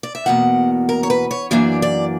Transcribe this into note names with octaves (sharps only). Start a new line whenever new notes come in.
D5
E5
E2 B2 A#3 F#5
A#4
C#5
B4
C#5
F#2 E3 A#3 D4 D5
D5